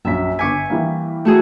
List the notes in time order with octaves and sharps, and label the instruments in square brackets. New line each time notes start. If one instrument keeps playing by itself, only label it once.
[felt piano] A#1 F#2 B6 [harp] E5
[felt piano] G1 D6 B6 [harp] G#5 C#6
[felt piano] E3 G3 A#3
[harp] A3 F#4 G#4